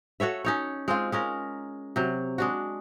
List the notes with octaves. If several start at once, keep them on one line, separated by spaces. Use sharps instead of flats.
F#4 A4 C#5 E5
C#4 D#4 C#5
G#3 C4 F4
G#3 C#4 A#4
C3 F#3
G#3 D4 F#4